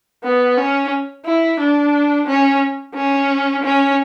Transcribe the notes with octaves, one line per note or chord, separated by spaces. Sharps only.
B3
C#4
E4
D4
C#4
C#4
C#4